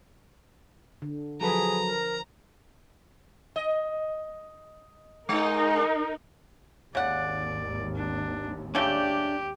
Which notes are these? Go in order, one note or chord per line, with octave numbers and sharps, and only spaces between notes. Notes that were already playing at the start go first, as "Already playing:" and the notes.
D3
F3 F#3 G#4 A4 B4 A#5
A#4
D#5
G#2 G#3 D#4 A#4
G#1 D#2 C#3 D5 F#5
D4
C#3 G3 A3 D4 G4 G5